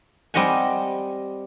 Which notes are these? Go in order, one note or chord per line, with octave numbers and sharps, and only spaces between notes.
G3 C4 D#5 F#5 G#5